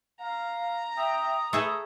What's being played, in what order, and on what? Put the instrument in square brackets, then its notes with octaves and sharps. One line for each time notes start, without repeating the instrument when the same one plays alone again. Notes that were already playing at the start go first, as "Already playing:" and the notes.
[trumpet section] F5 [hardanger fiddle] A#5
[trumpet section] E5 G5 [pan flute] D#6
[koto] A3 G#4 A4 [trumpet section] B4